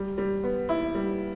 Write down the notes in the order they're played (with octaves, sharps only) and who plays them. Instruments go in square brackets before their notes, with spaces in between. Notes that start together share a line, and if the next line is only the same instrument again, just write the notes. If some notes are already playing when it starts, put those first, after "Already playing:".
Already playing: [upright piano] G3
G3
B3
E4
G3